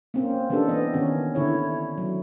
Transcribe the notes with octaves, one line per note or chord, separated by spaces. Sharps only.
A#3 C4 C#4
E3 B3 C#4 D4 G4 A4
B3 D#5
D#3 C#4
D3 E4 C#5
F#3